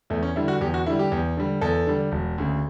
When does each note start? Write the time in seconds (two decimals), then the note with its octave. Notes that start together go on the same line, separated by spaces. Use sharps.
0.10 E2 A3
0.23 C#4
0.36 D3 G3 E4
0.48 F#4
0.61 E2 G4
0.74 F#4
0.86 D3 E4
0.90 G3
0.99 G4
1.12 E2
1.37 D3 G3
1.61 E2 A4
1.87 D3 G3
2.12 E1
2.38 D2 C#3